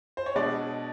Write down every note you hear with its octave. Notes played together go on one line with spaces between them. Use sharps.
C5
C#5
B2 G#3 B3 D4 D5